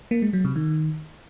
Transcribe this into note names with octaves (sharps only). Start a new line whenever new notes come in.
A#3
G#3
F#3
C3
D#3